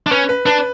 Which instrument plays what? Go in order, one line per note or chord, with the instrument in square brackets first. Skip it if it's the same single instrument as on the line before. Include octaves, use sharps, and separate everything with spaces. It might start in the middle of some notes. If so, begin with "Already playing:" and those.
[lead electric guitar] D4
[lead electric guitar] C#4 [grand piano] B4
[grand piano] B4
[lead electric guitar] D4 [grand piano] B4